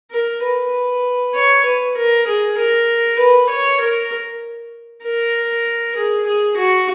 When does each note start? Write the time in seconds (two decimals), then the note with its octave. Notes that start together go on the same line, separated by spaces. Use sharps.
0.12 A#4
0.43 B4
1.34 C#5
1.65 B4
1.96 A#4
2.27 G#4
2.57 A#4
3.19 B4
3.49 C#5
3.80 A#4
5.03 A#4
5.96 G#4
6.27 G#4
6.57 F#4